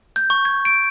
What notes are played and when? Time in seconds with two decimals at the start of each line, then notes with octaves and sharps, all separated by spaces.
0.16 G6
0.30 C#6
0.45 G#6
0.65 D7